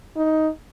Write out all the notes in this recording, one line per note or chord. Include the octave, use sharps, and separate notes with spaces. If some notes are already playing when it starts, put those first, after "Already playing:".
D#4